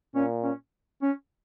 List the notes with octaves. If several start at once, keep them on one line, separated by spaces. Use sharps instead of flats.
A#2 C#4
C#4
C#4